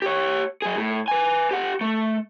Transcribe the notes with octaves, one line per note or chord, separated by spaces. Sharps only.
G4 C#5
F#3 G#4
A2
B4 G#5
G4 F#5
A3